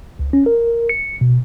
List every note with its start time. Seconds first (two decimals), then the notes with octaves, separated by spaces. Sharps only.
0.19 C#2
0.33 C#4
0.46 A#4
0.89 C#7
1.21 B2